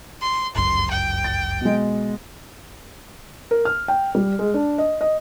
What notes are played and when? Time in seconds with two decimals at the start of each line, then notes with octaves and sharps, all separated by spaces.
0.21 C6
0.56 G1 C#2 F#2 C6
0.91 G5
1.24 A6
1.61 B2 G#3
3.51 A#4
3.65 F6
3.88 G5
4.15 G3
4.39 G#3
4.54 D4
4.78 D#5
5.01 D#5